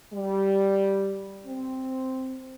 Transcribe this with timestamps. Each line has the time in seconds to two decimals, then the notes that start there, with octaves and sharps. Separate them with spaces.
0.13 G3
1.46 C4